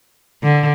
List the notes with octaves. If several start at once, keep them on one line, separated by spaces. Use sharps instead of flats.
D3